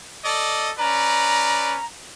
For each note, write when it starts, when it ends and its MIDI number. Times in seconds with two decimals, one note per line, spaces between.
0.25 0.71 69
0.25 0.71 74
0.25 0.71 75
0.79 1.77 61
0.79 1.77 71
0.79 1.77 74
0.79 1.85 82